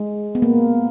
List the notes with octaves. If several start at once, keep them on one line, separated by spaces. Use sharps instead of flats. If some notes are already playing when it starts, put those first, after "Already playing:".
Already playing: G#3
B3
A#3